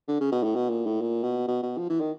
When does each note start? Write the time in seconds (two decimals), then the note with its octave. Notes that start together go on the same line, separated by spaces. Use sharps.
0.08 D3
0.20 C#3
0.32 B2
0.43 A2
0.55 B2
0.70 A#2
0.86 A2
1.01 A#2
1.23 B2
1.47 B2
1.62 B2
1.78 F3
1.90 E3
2.00 D#3